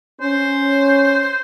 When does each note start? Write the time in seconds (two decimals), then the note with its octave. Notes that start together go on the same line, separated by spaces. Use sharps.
0.21 C#4 C5